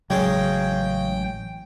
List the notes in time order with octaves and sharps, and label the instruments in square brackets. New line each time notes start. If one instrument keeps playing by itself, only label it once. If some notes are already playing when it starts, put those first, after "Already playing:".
[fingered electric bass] A1 F#3 [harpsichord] C#3 G#3 [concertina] G5